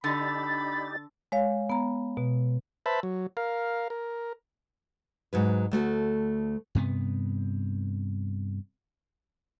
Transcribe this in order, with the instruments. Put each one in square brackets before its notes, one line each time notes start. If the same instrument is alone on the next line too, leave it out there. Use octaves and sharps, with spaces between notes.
[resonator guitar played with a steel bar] D3 [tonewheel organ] D4 D#4 G4 [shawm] B5 [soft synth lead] A6
[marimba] G#3 C#5 F5
B3 A#5
B2
[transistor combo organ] B4 C5 E5 A5 B5
F#3
A#4 F5
A#4
[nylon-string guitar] G#2 F#3 B4
D2 A3 F#4
[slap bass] G2 C3 B3